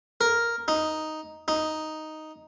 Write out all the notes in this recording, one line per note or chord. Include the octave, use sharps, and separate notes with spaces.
A#4
D#4
D#4